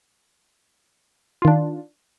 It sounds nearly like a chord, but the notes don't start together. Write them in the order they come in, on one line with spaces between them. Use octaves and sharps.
F4 D#3 D4